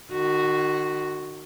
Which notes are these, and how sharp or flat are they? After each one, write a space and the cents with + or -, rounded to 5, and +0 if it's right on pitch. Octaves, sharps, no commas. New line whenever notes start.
D#3 -40 F#4 +0